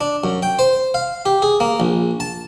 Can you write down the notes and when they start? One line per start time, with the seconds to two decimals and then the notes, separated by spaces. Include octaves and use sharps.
0.01 D4
0.24 F#2
0.43 G5
0.59 C5
0.94 F5
1.26 G4
1.42 G#4
1.60 A#3
1.80 A#1
2.20 A5